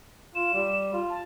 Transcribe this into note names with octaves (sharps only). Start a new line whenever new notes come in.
F4 E7
G3
F4
A5